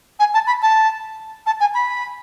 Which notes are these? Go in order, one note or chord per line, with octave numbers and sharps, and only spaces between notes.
G#5
A5
B5
A5
A5
G#5
B5